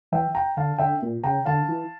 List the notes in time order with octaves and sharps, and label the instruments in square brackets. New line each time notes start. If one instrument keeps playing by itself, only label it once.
[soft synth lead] E3 [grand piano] E5 G5
[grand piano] G5 A#5
[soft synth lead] D3 [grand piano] F5 A5
[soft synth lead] D3 [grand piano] E5 G5
[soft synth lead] A#2
[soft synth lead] C#3 [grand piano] G5 A#5
[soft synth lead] D3 [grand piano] F5 A5
[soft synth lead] E3